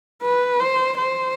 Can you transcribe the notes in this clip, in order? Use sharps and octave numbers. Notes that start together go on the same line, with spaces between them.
B4
C5
C5